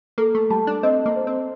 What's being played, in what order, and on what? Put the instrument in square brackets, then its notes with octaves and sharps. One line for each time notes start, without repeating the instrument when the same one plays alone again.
[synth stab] A#3 [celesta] A4
[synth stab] A3
[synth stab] G3 [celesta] A5
[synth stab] D4
[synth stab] C4 [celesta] D#5
[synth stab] A#3
[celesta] C5
[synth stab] C4